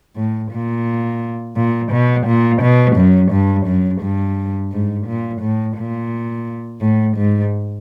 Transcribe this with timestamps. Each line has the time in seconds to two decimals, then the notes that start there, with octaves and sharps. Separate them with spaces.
0.17 A2
0.52 A#2
1.57 A#2
1.92 B2
2.27 A#2
2.62 B2
2.97 F#2
3.32 G2
3.67 F#2
4.01 G2
4.72 G#2
5.07 A#2
5.41 A2
5.78 A#2
6.81 A2
7.17 G#2